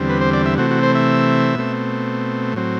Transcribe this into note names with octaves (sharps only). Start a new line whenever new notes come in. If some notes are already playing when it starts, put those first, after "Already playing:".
Already playing: E2 D3 G3 C4
B4
C5
D5
E5
C3 E3 A3 C4 F#4
F#4
C5
E5
B2 A3 C4
A2 F#3 C4